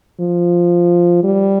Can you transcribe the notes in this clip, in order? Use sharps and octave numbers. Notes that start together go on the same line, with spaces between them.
F3
G3